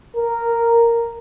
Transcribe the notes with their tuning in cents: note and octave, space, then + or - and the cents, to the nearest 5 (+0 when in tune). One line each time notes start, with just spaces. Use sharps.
A#4 -5